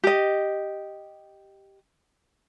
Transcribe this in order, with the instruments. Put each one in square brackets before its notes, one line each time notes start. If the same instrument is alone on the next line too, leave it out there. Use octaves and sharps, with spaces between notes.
[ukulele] G4 D#5